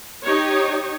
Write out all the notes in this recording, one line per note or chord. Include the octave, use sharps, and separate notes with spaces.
D#4 G4 C#5